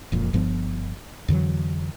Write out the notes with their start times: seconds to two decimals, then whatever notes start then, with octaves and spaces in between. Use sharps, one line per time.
0.12 E1 F2 A#2
0.33 G1 G2 F3 B3
1.28 F2 D3 E3 F#3